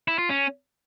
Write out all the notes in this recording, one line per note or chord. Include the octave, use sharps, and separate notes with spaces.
E4
F4
C#4